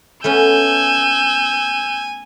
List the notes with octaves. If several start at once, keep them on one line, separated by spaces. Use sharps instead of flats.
A3 B3 C#4 G#5 E6 G6